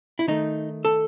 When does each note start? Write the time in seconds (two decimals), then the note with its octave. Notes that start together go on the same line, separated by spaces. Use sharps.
0.19 E4
0.28 D#3 A3 D#4
0.85 A4